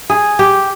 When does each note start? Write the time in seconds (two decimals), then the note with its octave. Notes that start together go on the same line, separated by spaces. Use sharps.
0.10 G#4
0.39 G4